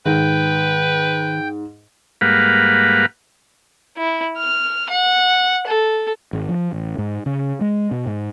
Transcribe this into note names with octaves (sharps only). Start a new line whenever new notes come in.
G#2 D#3 B4 G5
G#2 G3 A#3 B4 F5 F#5
E4
F6
F#5
A4
G#1
F3
A1
G#2
C#3
G#3
B2
G#2